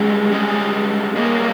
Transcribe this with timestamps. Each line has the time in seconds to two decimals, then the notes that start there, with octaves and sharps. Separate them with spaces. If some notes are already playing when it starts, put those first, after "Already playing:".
Already playing: G3 G#3 C#4 G#4 D#5
0.31 G3 C#4 G#4 D#5
1.15 G3 A#3 C#4 G#4 D#5